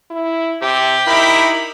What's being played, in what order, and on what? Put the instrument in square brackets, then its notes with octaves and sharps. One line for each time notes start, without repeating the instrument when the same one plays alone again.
[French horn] E4
[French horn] C3 [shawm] G4
[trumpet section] D#4 A#4 B5 [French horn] E4